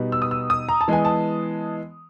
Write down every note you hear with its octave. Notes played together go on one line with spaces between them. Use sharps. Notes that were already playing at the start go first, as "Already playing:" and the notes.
Already playing: B2 G3 B3 D#4
E6
D#6
E6
D#6
A#5
A5
E3 G#3 B3 G#5
A5